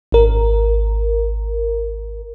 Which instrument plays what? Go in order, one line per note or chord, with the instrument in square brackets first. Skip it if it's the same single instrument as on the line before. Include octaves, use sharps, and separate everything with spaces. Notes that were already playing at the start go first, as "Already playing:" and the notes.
[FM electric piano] G#1 A#4